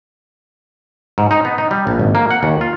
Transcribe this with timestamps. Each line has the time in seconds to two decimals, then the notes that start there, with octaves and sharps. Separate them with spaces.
1.18 G#2
1.31 D#4
1.45 B3
1.58 D#4
1.71 G3
1.87 A#1
1.99 G#1
2.15 A#3
2.31 F#5
2.43 D#2
2.61 F4